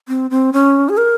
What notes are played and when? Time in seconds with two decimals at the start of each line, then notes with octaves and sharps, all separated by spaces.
0.08 C4
0.31 C4
0.53 C#4
0.89 G#4
0.97 A#4